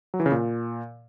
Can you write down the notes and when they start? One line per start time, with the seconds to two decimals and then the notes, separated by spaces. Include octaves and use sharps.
0.14 F#3
0.20 E3
0.26 C#3
0.32 A#2